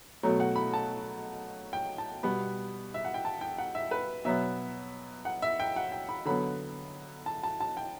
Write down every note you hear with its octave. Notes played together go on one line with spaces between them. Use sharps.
B2 F#3 A3
F#5
B5
A5
G5
A5
B2 G3 B3 B5
E5
F#5
G5
A5
G5
F#5
E5
B4
B2 F#3 B3 E5
F#5
E5
G5
F#5
G5
B5
D3 F#3 B3 B5
A5
A5
A5
G5